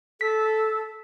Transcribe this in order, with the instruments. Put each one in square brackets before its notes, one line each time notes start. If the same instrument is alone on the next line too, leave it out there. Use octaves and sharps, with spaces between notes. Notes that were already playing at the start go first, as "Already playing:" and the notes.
[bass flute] A4 [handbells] B6